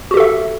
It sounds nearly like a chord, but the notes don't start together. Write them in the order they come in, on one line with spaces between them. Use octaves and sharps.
F#4 G4 A4 E5